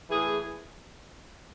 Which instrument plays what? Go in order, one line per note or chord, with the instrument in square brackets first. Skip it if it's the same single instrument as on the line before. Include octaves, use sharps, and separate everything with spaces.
[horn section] A2 E3 G#4